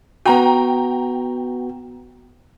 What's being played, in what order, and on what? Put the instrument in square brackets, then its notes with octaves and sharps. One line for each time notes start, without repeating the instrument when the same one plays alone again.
[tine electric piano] B3 F#4 [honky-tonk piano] G5 A#5